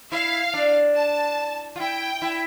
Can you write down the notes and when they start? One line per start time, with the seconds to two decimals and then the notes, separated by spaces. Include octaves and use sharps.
0.12 E4 F5
0.54 D4
0.95 A5
1.76 F4
1.79 E4 G5
2.22 E4